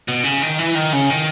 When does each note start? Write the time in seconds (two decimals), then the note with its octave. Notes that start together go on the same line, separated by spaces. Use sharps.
0.08 B2
0.24 C#3
0.42 D#3
0.59 E3
0.75 D#3
0.93 C#3
1.10 D#3